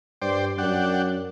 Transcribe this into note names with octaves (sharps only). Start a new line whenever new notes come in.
G2 C5 D5 G5
F#2 D4 F#5 G5